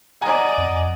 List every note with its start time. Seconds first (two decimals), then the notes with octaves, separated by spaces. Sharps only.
0.21 D5 D#5 F#5 G#5 A#5
0.58 F2